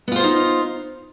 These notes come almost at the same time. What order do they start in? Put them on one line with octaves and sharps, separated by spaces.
B3 F4 C5 F5 D#4